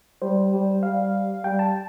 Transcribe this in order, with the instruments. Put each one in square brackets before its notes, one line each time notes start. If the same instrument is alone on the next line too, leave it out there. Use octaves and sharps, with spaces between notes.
[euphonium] G3 [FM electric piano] C5
[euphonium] G3
[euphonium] G3 [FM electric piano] F5
[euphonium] G3 [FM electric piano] G5
[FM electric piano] A5